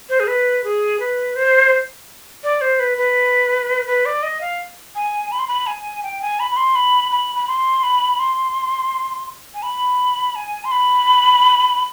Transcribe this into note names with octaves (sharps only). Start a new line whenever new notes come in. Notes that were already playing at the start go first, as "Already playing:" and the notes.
C5
G#4
B4
G#4
B4
C5
D5
C5
B4
B4
B4
D5
D#5
F5
G#5
B5
C6
B5
G#5
G5
G#5
B5
B5
C6
B5
B5
B5
C6
B5
C6
G#5
B5
G#5
C6
B5